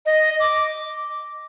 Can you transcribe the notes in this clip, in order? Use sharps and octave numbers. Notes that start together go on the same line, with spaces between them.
D#5
D6